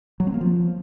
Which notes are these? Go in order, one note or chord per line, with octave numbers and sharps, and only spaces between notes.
F#3
C4
A#3
F3